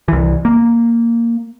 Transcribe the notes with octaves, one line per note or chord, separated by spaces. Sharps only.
C2 E3
A#3